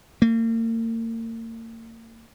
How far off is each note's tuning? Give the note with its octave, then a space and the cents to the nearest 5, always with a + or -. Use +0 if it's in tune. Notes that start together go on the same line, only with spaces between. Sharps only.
A#3 -40